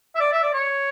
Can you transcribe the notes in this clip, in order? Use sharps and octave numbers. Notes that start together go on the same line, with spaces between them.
E5
D5
E5
D5
C#5